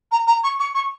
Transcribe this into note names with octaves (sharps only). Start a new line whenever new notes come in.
A#5
A#5
C#6
C#6
C#6